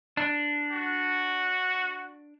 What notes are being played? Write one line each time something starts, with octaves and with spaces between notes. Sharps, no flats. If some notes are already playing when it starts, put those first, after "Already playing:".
D4
F#4